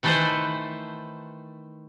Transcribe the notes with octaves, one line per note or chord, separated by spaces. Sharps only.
D#3 E3 A3 A4 B4 C5